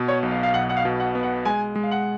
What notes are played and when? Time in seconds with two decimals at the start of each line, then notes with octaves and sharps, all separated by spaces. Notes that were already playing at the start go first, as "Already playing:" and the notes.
Already playing: B2 B3
0.08 C#5
0.23 B1
0.31 F5
0.43 F5
0.54 B1 F#5
0.69 F#5
0.77 F5
0.85 B2
1.00 F#5
1.15 B3
1.23 F#5
1.45 G#3 G#5
1.75 G#3
1.83 F5
1.91 F#5